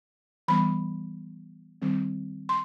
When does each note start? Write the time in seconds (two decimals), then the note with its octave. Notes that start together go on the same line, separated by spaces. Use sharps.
0.48 E3 G3 B3 B5
1.82 D#3 G3 C4
2.49 C6